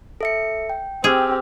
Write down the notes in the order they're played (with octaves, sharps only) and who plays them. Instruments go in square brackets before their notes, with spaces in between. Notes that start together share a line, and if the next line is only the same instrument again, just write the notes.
[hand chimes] A4 E5 C#7
G5
[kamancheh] C4 G4 [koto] G#4 [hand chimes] E6 F6